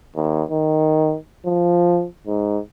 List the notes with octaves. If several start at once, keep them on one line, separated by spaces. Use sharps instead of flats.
D#2
D#3
F3
G#2